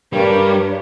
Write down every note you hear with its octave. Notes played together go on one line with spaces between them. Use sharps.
G2 G3 D4 G4 A#4 C#5